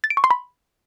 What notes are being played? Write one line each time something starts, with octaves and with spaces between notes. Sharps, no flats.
A6
D7
C#6
C6
B5